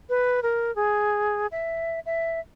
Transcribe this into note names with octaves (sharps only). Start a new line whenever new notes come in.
B4
A#4
G#4
E5
E5